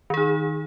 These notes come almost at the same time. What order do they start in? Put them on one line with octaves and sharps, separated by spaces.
D#3 G#4 D#4